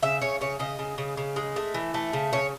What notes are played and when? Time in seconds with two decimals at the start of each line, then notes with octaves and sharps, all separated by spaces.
0.03 C#3 E5
0.21 C#3 C#5
0.41 C#3 C#5
0.59 C#3 D#5
0.79 C#3
0.98 C#3
1.17 C#3
1.36 G#3
1.56 A3
1.74 E3
1.94 A3
2.13 C#3
2.33 C#3 C#5